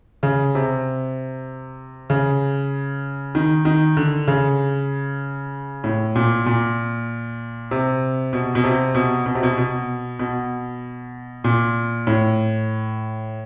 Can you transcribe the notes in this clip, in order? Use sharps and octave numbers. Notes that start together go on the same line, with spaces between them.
C#3
C3
C#3
D#3
D#3
D3
C#3
A2
A#2
A#2
C3
B2
B2
C3
B2
B2
C3
B2
B2
B2
A#2
A2